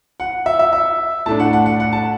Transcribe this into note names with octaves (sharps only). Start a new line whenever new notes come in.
F#5
E5
E5
E5
A2 A3 D4 A5
F#5
F#5
F#5
F#5
A5